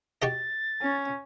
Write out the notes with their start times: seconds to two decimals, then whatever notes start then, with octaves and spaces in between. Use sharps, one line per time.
0.22 F#4 G4 D#5 A6
0.82 C#4